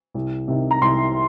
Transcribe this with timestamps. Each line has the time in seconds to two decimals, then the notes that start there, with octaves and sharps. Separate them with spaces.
0.14 C2
0.48 C3 D#3
0.71 A#5
0.82 C2 C6